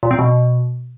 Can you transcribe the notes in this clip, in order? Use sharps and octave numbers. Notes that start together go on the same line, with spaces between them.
A#2
C4
B2